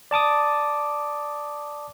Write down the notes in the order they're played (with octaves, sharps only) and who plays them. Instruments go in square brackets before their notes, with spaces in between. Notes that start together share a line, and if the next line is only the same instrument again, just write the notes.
[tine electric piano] D5 A5 D6 D#6